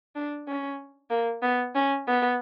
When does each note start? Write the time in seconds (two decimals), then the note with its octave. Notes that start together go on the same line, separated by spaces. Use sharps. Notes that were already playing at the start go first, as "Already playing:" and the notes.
0.15 D4
0.48 C#4
1.10 A#3
1.43 B3
1.75 C#4
2.07 B3